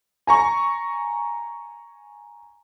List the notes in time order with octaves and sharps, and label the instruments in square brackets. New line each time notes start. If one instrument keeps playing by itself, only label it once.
[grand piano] G#5 A#5 C#6